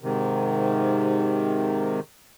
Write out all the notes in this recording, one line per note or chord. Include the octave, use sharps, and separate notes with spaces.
G#2 C3 D#3